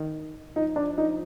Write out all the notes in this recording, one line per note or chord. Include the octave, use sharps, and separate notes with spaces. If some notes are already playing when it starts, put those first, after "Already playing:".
Already playing: D#3
F3 D#4
D4
D#4